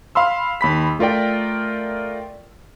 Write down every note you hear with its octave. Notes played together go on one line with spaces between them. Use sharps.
F5 B5 C6 E6
D#2 B5 B6
A3 F4 A#4 D5 G5